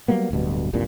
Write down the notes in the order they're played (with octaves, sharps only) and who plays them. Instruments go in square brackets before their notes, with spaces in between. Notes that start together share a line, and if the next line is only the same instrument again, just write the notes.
[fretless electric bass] F#3 G3 A#3 B3
D1 D2 G2 B2
F#1 C2 G2 A#2